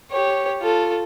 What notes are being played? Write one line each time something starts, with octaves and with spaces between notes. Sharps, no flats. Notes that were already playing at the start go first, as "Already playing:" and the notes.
G4 C#5
F4 A4